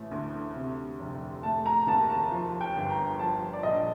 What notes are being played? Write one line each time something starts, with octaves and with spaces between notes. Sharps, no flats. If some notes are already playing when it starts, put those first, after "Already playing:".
Already playing: A1 A3
D2
C3
F1
A3 A5
A#5
D#2 A5
A5
F3
G5
G1
A#5
F3 A5
D5
A#1 D#5